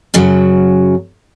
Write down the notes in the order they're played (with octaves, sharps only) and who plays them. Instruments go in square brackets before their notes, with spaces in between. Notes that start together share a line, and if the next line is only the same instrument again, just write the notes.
[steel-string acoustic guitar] F#2 C#3 F#3